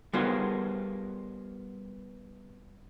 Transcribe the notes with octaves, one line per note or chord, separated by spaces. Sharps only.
G3 B3 F4 G#4 A#4 C5